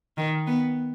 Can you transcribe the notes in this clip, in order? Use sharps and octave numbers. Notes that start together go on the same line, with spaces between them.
D#3
B3